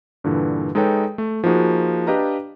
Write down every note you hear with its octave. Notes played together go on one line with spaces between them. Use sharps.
G2 A#2 D3 E3
G#3 D#4 A4 B4 C#5 G5
A3
F3 A#3 D#4 F#4 G#4
D4 G4 B4 D#5 F5 A#5